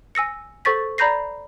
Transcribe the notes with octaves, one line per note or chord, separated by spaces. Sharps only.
G#5 E6 A#6 C#7
A4 C5 C#6 A6 B6
D5 A#5 B5 G6 A#6 C7